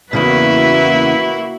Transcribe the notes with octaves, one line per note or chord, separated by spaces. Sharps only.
E2 A2 C#3 A#3 E4 F#4 B4 E5